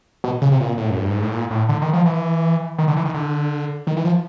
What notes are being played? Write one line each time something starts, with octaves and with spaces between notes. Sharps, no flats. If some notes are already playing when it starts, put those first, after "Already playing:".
B2
C#3
C3
A#2
A2
F#2
G2
G#2
A2
A#2
A2
D3
D#3
F3
E3
D#3
D3
E3
D#3
D3
D#3
E3
F3